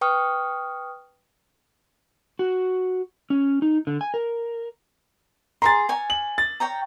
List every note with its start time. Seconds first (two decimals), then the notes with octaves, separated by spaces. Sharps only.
0.01 B4 G5 C#6 D#6 F6
2.39 F#4
3.30 C#4
3.62 D#4
3.87 D3
4.01 G#5
4.14 A#4
5.62 G#4 A#4 A#5 C6 A6
5.89 C#5 G#5
6.10 F#7
6.38 A6
6.60 C#5 G5 A#5